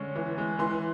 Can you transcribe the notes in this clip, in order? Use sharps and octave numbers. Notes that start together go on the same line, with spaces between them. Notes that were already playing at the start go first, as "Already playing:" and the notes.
Already playing: D3 G#3 C#4
E3
G#3
E3 C6